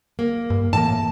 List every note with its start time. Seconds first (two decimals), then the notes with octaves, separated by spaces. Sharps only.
0.19 A#3
0.50 G2
0.73 A2 E3 A#3 A5